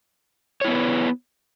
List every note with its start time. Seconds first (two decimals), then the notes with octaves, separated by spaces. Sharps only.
0.61 C#5
0.64 E4
0.68 B3
0.71 B4